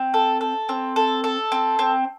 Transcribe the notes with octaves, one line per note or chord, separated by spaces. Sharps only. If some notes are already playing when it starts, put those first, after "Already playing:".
Already playing: C4
A4
A4
C4
A4
A4
C4
C4